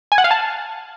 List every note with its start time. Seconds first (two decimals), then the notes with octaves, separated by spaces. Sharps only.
0.12 G#5
0.18 F#5
0.24 F5
0.31 A5